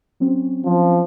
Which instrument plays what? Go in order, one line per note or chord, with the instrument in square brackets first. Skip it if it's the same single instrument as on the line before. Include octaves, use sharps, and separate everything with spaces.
[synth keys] F#3 C4 C#4
[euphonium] F3